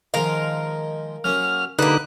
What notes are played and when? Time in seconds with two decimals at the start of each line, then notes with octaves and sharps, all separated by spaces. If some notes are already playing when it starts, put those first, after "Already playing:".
0.14 D#3 F3 G#3 A#4 F5
1.24 F#3 A#3 C#4 F6
1.79 D3 G3 A#3 D#4 B4 D5 F#6